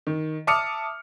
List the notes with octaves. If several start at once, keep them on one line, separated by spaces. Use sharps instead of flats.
D#3
E5 A5 D6 D#6 F6 C#7